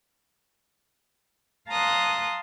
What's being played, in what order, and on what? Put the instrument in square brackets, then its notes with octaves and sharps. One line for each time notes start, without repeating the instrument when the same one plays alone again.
[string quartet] F5 A5 A#5 C6 D#6 F#6